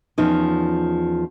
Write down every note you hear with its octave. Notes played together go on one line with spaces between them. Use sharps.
E2 F3 C#4 D#4